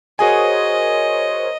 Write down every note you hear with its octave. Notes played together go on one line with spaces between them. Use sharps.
F#4 G#4 A#4 C5 C#5 D#5 G#5